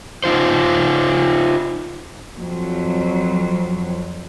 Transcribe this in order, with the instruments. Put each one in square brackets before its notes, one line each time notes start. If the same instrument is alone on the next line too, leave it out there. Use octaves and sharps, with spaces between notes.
[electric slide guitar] D#4 F4 C5
[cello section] F2 F#3